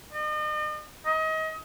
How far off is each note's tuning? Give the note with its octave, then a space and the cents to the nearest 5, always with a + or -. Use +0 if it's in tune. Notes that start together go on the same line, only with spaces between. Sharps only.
D#5 -40
D#5 +30